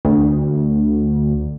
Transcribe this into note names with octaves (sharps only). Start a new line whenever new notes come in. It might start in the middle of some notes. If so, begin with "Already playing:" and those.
D2